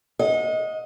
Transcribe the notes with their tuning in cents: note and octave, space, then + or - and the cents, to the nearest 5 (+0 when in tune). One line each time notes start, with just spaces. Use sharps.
D#5 +15 F#5 -40